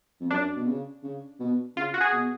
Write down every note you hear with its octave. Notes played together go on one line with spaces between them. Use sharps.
F2
F#2 D4
B2
C#3
C#3
B2
C#3 F4
F#4
G#4
B2